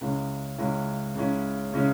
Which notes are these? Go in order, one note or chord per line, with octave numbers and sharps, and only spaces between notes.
C#2 C#3 G#3 C#4 E4
C#2 C#3 G#3 C#4 E4
C#2 C#3 G#3 C#4 E4
C#3 G#3 C#4 E4